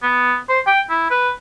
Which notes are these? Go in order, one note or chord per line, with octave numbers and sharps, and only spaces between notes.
B3
C5
G5
E4
B4